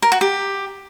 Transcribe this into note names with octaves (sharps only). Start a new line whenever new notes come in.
A#4
F#4
G4